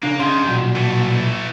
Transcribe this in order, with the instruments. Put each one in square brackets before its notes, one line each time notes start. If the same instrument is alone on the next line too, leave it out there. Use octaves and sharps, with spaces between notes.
[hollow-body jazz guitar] C#3 D4 [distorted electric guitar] A#3
[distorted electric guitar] C2 D#3 [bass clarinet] C#4 [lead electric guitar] G#4 [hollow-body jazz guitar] C6
[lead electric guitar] B1 A#2 [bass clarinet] F#4
[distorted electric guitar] E3 A3